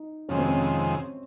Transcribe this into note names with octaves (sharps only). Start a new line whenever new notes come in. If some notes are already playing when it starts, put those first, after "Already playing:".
Already playing: D#4
F2 C3 D#3 G#3 C#4
C4
C#4